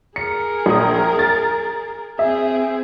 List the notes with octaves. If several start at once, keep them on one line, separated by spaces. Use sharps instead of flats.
G#4 A#4 C#7
A#1 D#6
A6
C4 G#4 E5